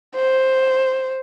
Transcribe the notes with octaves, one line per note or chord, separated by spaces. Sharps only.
C5